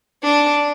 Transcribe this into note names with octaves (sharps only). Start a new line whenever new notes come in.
D4